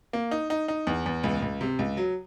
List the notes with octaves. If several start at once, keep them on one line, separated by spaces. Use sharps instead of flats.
A#3
D#4
D#4
D#4
E2
E2
C#2
C#2
C3
C#2
F#3